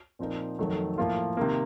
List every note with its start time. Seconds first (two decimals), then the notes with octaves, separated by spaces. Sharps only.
0.19 A#2 F3 C4 D#4 A#4
0.59 F2 D#3 F#3 A3
0.98 A2 F3 A#3 F4
1.37 C3 D#3 A#3